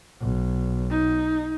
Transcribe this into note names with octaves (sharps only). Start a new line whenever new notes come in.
B1
D#4